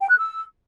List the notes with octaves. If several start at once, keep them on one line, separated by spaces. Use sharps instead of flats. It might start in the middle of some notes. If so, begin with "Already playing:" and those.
G5
F#6
E6